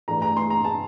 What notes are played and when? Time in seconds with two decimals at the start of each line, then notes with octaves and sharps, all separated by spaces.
0.08 G2 E3 A3 D4 A#5
0.22 A#5
0.37 C6
0.50 A#5
0.64 A5